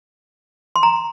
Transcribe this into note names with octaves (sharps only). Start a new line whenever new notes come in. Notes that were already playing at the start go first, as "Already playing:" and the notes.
C6
A#5